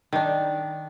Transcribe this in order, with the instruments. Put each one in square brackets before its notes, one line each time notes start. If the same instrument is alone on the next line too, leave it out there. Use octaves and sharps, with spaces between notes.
[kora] D#3 D4